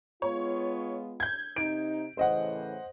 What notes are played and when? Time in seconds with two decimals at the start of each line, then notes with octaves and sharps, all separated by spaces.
0.22 G#3 B3 F4 C#5
1.20 G6 G#6
1.56 C3 D#4 D7
2.17 A2 C#3 E3 C5 D#5 F#5